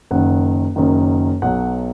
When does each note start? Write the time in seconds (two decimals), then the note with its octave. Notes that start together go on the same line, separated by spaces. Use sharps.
0.11 F#1 F#2 D#3 F#5
0.76 F#1 F#2 D#3
1.42 B1 B2 F#3 F#5